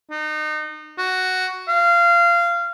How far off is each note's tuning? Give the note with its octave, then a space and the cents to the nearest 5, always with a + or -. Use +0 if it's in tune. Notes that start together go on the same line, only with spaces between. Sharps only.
D#4 -30
F#4 +5
F5 -20